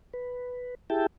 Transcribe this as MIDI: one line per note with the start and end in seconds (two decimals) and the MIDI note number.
0.13 0.75 71
0.90 1.06 64
0.90 1.06 67
0.90 1.06 68
0.90 1.06 76
0.90 1.06 79
0.90 1.06 81